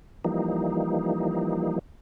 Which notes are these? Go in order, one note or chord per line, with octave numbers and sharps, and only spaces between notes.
E3 F3 G3 A#3 D#4